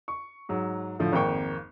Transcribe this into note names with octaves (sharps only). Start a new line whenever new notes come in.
C#6
G#2 F#3
A2 D3 F3
G#1 F2 A#3 G5 C#6